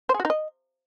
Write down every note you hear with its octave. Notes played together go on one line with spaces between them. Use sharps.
C5
G#4
F#4
D#4
D#5